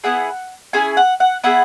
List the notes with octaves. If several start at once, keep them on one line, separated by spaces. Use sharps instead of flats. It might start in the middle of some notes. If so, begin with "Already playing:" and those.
B3 E4 G#4 F#5
C#4 E4 G#4 G#5
F#5
F#5
B3 E4 G#4 F#5